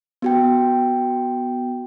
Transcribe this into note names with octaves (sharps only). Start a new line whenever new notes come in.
B3 F#4 G5